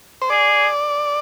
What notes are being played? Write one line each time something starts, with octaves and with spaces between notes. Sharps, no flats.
C5
G#4 D5